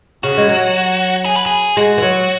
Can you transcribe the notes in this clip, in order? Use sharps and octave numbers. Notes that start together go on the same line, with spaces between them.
C#3 F#4
G#3
F#3
G#4
B4
G#4
G#3 F#4
E3
F#3